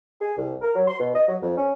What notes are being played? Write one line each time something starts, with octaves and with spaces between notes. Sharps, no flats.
G#4
C2
A#4
F#3
C6
B2
D#5
F#3
F2
C#4